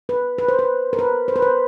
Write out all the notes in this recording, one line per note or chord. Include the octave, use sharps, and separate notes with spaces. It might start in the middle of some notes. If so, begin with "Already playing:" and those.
B4
B4
C5
B4
A#4
B4
C5
B4
C5